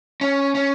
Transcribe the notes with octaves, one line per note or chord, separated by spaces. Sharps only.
C#4
C#4